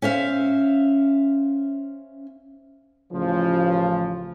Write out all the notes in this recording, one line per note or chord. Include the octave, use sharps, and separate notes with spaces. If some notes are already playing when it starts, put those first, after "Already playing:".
C#4 C5 E5 F5
A1 C#3 F3